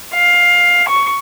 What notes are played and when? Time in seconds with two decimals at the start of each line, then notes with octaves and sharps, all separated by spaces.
0.13 F5
0.87 C#6